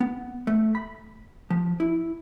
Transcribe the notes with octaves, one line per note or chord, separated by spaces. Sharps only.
B3
A3
B5
F3
E4